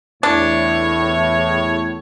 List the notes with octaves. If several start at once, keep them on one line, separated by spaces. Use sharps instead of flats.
E2 A2 D4 C#5